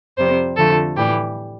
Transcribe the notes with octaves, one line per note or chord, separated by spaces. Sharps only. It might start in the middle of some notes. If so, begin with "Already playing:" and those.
F2 C3 G3 C5
F2 D3 F3 A3 A4
A2 E3 G3 G4